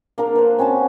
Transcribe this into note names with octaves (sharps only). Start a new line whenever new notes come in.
A#3 D4 A#4
B4 C5
C4 C#4 F#4 A5